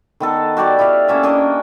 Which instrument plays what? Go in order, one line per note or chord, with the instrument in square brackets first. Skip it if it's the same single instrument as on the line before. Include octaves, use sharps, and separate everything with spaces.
[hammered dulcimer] D#3 B3 A4 A#4
F#4 G4 D5 C#6
E4 G4 D5 F5
A#3 C#4 E5
C#4 D4 A#4 D#5